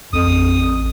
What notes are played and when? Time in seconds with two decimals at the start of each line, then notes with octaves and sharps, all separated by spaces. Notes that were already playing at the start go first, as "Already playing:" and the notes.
0.13 A1 F2 D#6